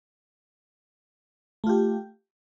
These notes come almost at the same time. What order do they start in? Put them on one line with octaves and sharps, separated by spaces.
A3 F4 G4